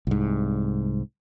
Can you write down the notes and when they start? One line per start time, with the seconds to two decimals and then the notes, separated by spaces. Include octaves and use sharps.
0.07 C2 G#2